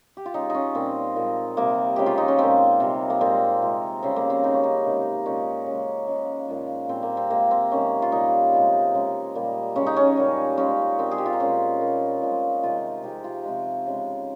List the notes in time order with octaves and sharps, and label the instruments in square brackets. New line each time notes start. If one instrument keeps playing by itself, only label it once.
[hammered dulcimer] G4
F4
C#3 G#3 D#4
C#4 D#4
A#2 G3 C4
A#2 F3 G#3
C3 G3 A#3
C#3 F3 G#3 G4
F4
D#4
C#4
A#2 G#3 C4
C3 G3
A#3
A#2 G#3 C4
C3 F3 G#3
C#3 G3 C4
A#3
C4
C#3 G3 D#4
C#4
D#4
C3 D#3 G#3
A#2 F3 G#3 C#4
C#3 G#3
C#3 G#3
A#2 F3 G#3
A#2 G3 C4
A#3
C4
C3 F3 G#3 A#3
C4
C3 D#3 G#3 C#4
F4
A#2 G3 D#4
C3 F3 G#3
C#3 G#3
A#2 G3
C#3 G#3 C#4
D#4
C#4
A#2 G3
A#2 F3 G#3 C#4
A#2 G#3 C4
G#4
G4
F4
D#4
A#2 F3 G#3 C#4
A#2 G3
A#2 F3 G#3
C3 D#3 G#3 F4
C3 F3 G#3 G4
F4
C3 F3 G#3
C#3 G#3